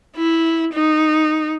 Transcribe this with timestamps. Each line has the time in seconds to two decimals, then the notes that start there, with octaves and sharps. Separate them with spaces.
0.16 E4
0.73 D#4